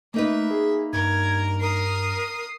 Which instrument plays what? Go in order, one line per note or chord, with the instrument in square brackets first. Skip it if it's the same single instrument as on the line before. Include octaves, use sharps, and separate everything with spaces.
[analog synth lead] A3 [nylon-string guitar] A#3 D#4 B4 [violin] E5
[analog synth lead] G#4
[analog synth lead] G2 [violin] A#4 [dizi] G#6
[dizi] A#4 [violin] D#6 C7